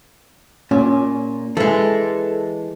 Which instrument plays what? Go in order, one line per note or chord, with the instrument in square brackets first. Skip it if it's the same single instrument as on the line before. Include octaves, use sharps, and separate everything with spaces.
[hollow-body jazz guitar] A#2 [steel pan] C#4
[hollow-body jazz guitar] E3 G#3 [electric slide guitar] A4